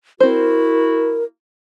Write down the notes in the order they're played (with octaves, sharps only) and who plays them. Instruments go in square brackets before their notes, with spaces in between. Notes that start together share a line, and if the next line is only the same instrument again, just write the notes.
[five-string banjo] C4 C5 [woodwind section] E4 F#4 [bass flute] A#4